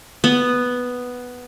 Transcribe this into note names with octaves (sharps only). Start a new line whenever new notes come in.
B3